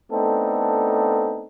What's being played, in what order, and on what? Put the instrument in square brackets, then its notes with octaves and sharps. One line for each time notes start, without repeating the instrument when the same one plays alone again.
[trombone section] A3 B3 C4 D4 D#4 A4